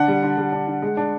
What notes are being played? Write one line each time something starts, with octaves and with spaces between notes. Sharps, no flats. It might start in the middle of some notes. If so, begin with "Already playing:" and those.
Already playing: D3 D4 F#5
G3
D3
G3
D4
D3
G#3
D4